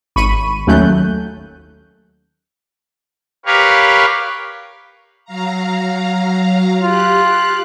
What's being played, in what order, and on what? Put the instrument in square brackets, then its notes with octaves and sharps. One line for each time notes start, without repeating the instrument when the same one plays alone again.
[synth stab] G#1 B5 C#6 D#7
D#2 F#3 A3 C#4 F#6 G6
[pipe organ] G4 A#4 B4 C#5 F5
[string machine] F#3 F5 A#5
[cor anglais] F4 [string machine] G4 F#6